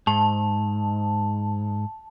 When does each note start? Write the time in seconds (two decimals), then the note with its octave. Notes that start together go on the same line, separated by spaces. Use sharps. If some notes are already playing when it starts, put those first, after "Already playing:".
0.07 G#2 A5